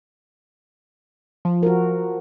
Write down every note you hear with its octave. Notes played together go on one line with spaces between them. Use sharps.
F3
F#4 A#4